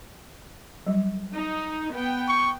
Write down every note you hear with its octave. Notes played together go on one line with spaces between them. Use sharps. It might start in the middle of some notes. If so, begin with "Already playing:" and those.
F#3 G3
D#4
B3 G5
C#6